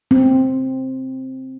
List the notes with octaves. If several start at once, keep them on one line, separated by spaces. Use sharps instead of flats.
C4